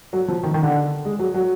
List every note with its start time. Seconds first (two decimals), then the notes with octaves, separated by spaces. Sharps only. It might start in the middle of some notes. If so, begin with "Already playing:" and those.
0.13 F#3
0.28 F3
0.43 D#3
0.54 D#3
0.63 D3
1.05 G#3
1.19 F#3
1.34 F#3